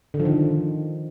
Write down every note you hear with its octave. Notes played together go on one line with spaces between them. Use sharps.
D3
F3
D#3